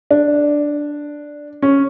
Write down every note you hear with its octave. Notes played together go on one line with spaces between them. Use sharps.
D4
C#4